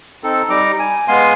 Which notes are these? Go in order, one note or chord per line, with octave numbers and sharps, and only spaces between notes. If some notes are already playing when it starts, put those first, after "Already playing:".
C4 D#4 A4
G3 D#4 A#5 D6
G#5
G#3 B3 F5 G#5 C6